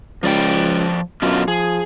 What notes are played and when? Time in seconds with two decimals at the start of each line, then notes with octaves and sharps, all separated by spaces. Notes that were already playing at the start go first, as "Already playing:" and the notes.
0.23 C#2 F3 D5 G5
1.22 F#2 B2 D3 F4
1.48 F3 G#4